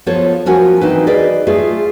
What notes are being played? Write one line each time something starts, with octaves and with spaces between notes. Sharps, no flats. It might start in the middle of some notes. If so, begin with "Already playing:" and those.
F3 B3 F4 A4 C5 C#5
F3 C#4 F4 F#4 A#4 G#5
E3 C4 D#4 B4
G#4 B4 D5 D#5
A3 F4 G#4